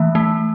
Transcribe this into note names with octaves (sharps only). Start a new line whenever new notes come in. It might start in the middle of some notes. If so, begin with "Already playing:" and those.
Already playing: E3 G#3 A3
A3